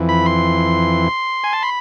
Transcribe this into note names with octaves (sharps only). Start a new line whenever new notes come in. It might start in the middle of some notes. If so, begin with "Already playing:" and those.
Already playing: F2 E3
B5
C6
G#5
A5
B5